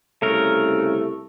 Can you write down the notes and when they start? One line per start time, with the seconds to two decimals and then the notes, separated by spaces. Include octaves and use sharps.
0.22 C2 C#3 A3 A#4